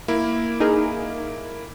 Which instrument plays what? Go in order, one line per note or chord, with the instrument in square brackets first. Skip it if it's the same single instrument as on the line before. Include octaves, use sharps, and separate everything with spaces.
[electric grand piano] A#3 E4
[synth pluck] D#4 G#4 A#4